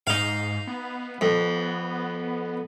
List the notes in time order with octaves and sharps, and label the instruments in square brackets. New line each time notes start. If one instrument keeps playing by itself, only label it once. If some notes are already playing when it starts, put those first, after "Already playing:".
[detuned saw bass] G#2 [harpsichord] D#4 F5
[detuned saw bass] B3
[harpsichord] F2 [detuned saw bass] B3